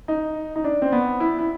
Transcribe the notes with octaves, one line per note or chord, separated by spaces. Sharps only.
D#4
D#4
D4
C4
B3
E4
E4